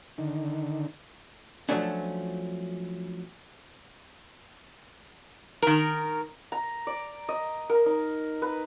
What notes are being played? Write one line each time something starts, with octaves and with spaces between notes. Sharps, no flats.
D3 D#3
F3 F#3 A3 C#4 D4
D#3 A#4
A#5
D5
D#5
A#4
D#4
B4